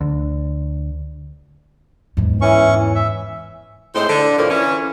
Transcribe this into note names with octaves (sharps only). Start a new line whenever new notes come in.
D2
E2 G#2
E3 C#4 C#6
E5
A2 G#3 C4 C5
D3
F2 A2 A#3
E3 C#4